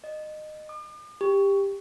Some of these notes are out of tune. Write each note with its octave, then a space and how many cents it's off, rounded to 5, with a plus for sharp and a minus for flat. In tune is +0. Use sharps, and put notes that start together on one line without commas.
D#5 -20
D6 +45
G4 +15